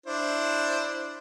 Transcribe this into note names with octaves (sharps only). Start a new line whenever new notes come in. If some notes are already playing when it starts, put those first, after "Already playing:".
D4 E4 C5